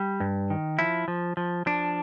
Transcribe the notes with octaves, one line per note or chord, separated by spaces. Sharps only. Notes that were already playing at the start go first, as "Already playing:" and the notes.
Already playing: G3
G2
D#3
F3 E4
F3
F3
F3 D4